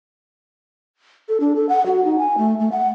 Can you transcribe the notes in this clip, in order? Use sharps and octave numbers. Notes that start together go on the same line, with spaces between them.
A4
D4
A4
F#5
F#4
D#4
G#5
A3
A3
F#5